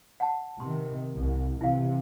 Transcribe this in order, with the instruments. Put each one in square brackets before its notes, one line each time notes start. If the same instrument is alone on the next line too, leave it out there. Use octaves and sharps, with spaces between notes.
[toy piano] F#5 A5
[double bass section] C3 D#3 [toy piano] C6
[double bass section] C2
[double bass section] C3 E3 [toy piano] E4 F5